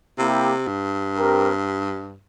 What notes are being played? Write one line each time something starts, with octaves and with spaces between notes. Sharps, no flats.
C3 A#3 E4 G4
G2
C4 G4 A#4